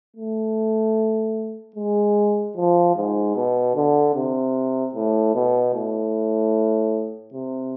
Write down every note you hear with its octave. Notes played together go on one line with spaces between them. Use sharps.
A3
G#3
F3
G#2
B2
D3
C3
A2
B2
A2
C3